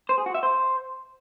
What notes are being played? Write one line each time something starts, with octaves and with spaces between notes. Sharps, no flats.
C5
G#4
F#4
E5
C5